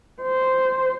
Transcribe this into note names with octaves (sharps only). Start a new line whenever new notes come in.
C5